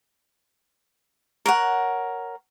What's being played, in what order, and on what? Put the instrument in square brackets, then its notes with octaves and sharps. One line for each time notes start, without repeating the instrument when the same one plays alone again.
[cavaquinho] A#4 C#5 F#5